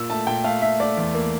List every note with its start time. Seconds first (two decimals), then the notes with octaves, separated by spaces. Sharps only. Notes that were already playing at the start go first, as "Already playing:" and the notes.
Already playing: A#2 E6
0.10 A3 A5
0.27 A#2 G5
0.44 A3 F5
0.62 A3 E5
0.80 A3 D5
0.97 E2
1.15 A#3